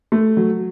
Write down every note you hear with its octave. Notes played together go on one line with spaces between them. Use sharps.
A3
F#3